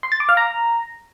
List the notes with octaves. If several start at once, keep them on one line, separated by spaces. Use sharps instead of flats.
C6
A6
D6
F5
A#5